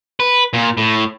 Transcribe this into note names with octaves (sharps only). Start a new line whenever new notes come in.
B4
A#2
A2